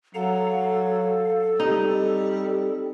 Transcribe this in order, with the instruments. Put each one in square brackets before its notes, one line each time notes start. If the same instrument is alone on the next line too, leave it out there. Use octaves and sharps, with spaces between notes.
[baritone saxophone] F#3 [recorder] A4 [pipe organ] F5 F#5 A#5
[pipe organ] F5
[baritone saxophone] G3 [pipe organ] C4 [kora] D#4